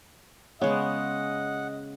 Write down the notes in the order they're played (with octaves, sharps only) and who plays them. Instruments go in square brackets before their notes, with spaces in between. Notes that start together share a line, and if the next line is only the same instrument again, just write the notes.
[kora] C#3 C#5 [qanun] G#3 B3 [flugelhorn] D#5 [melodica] F#5